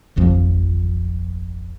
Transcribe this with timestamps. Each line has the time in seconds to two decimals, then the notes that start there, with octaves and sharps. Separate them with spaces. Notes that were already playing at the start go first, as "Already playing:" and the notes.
0.16 D1 G#1 F2 F3